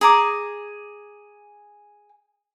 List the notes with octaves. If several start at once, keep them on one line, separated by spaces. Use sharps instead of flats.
G#4 A#5 D6